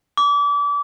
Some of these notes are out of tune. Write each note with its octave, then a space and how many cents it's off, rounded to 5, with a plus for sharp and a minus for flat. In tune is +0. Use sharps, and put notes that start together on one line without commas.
D6 -30